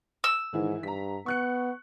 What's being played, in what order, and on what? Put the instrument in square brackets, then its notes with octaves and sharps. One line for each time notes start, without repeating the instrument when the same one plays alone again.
[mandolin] E6
[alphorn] G#2 [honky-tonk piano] D#3 E3 E4
[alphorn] G2 [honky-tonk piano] A#5 B6
[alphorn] B3 [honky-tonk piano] C#6 F#6 C#7